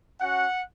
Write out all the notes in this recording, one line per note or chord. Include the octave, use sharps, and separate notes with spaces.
C#4 F#4 F#5